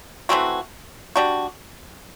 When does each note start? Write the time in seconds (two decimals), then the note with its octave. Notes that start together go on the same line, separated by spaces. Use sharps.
0.29 E3 A3 C4 F#4
1.16 G3 D4 F#4